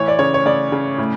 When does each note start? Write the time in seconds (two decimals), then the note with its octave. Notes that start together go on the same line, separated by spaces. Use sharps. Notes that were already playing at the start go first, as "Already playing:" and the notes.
Already playing: A2 E3 C#5
0.08 D5
0.19 C#3 C#5
0.34 C#5
0.45 C#3 D5
0.72 C#3
0.98 A2